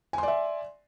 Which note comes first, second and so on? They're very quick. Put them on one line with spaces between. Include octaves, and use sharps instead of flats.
G#5 C6 D5 E5